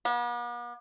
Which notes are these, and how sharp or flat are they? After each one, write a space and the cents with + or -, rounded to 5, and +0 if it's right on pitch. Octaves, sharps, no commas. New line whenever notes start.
B3 -45